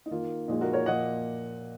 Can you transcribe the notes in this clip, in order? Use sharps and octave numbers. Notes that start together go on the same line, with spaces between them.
D#4
D#3 A#3 F4
A#2 F3 G#3 D#4
F#4 A#4
A#4 C#5
A#2 F3 A#3 D#5 F#5